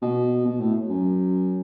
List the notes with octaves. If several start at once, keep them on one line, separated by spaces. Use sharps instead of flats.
B2
B2
A2
F#2